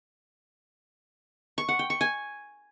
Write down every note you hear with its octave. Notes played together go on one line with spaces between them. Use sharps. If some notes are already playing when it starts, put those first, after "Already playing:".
C#6
F#5
G5
C#6
G#5